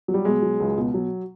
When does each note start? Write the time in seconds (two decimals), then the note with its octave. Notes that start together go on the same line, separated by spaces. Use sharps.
0.08 F#3
0.14 G3
0.25 B2 G#3
0.42 F#3
0.60 C#2
0.78 B2
0.94 F#3